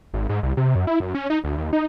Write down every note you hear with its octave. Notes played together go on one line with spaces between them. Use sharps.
G#1
G#2
C2
C3
F#2
E4
F#2
C#4
D#4
D2
D#2
D#4